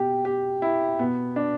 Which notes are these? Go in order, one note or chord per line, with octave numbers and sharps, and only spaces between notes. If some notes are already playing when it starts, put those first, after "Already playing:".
Already playing: B2 G4
G4
E4
B2 B3
D4